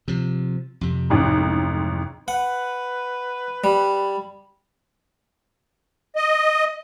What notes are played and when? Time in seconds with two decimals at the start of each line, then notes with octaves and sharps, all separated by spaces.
0.08 C3 F3
0.81 F2 C3
1.10 A1 G#2
2.28 B4 F#5
3.64 G3 B5
6.16 D#5